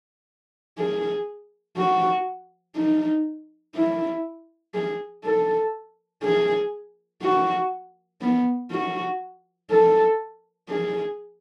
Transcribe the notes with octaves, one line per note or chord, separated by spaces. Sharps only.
G#4
F#4
D#4
E4
G#4
A4
G#4
F#4
B3
F#4
A4
G#4